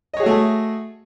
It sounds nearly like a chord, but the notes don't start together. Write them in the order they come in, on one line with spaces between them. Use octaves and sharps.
D#5 C#5 G#4 F#4 A3